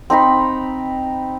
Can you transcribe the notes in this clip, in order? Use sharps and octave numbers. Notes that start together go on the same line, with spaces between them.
C4 D#4 A#5 B5